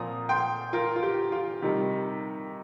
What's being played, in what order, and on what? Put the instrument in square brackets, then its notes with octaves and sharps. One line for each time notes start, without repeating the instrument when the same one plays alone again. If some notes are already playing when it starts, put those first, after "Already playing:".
Already playing: [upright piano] A#2 F3 C4 A#5 D#6
G5 C6
F4 A#4
F4
G4
F4
C3 D#3 G3